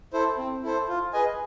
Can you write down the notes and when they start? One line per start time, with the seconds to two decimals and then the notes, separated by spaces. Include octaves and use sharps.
0.13 E4 A4 C5
0.38 C4
0.63 E4 A4 C5
0.89 F4
1.13 G#4 B4 D#5 G#5